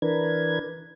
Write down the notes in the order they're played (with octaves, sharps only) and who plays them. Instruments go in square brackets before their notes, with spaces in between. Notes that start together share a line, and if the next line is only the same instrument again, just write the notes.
[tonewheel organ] E3 D4 A#4 B4 G#6